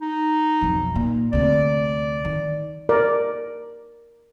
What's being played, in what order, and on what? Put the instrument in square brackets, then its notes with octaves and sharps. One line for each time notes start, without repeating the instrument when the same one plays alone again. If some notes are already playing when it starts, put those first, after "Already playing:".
[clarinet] D#4
[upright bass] B1 F2
A#2
[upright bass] D2 C3 [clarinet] D5
[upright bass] D#3
[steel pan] A#4 D5